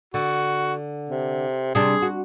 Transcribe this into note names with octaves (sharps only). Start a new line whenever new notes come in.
D3 F#4
C3
C3 G3 D4 G#4
F#4